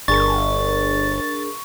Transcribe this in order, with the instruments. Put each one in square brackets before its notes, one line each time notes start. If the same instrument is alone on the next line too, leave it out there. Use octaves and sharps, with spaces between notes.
[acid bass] G1 [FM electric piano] D4 G#4 A#4 [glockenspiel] C#6 [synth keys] A6